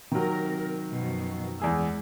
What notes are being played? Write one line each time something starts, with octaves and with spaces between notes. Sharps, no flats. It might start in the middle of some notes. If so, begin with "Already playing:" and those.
C3 D#3 F#3 A#4
F#2 B2 F3
E2 G#3 G#4 E6